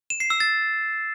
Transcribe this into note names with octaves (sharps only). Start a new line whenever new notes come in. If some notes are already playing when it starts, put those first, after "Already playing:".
E7
C7
E6
A6